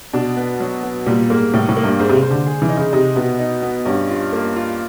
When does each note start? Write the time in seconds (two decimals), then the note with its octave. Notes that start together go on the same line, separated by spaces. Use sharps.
0.13 B2 D4
0.37 B3
0.60 F#3
0.83 B3
1.06 A#2 G3
1.30 G#2 A#3
1.53 A2 G3
1.69 A2
1.77 A#3
1.84 G2
1.99 G#2 C5
2.09 C3
2.16 C#3
2.23 C5
2.31 D3
2.46 G#4
2.62 E3
2.69 D#4
2.77 C#3
2.93 C3 D#4
3.16 B2 B3
3.39 D#4
3.62 B3
3.86 G2 C#4
4.10 F4
4.33 A#3
4.56 F4